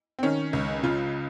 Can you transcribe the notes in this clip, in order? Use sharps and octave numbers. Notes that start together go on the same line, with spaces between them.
C4
D#3 C#4
C#2
C#3 F4